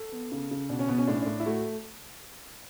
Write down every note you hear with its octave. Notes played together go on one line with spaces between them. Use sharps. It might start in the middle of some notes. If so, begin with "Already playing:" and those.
Already playing: A4
B3
C#3
C#3
B2 D4
C#4
B2 B3
C#4
A2 D4
C#4
A2 D4
E4
A3 F#4